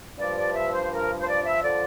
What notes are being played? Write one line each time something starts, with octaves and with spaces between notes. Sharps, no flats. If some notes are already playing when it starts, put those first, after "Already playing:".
G2 F3 D5
D5
E5
C5
A#4
C5
D5
E5
D3 F3 D5